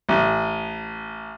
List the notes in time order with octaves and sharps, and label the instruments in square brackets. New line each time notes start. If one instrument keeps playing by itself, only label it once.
[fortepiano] A1